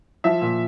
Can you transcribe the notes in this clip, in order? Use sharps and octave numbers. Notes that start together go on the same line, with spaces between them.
F3 E5
A#2